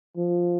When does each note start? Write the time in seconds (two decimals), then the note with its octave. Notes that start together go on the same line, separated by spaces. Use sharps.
0.17 F3